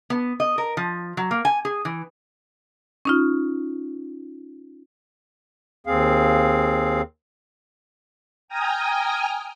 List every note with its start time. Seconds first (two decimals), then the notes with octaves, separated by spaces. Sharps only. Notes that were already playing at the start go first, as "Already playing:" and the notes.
0.10 B3
0.40 D#5
0.58 A#4
0.77 F3
1.17 F#3
1.31 A#3
1.45 G#5
1.65 G#4
1.85 E3
3.05 C#4 D#4 F4
5.87 D#2 C4 G#4 F5
8.48 G5 G#5 A#5 D#6 F6